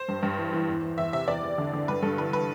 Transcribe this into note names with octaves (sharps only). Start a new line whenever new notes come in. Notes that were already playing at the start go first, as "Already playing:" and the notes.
Already playing: C5
G2
G2
E3
E3
E2
E3
E2 E5
C3 E5
E2 D5
E2
D3
D3
G2 B4
G2 A4
E3 B4
E3 B4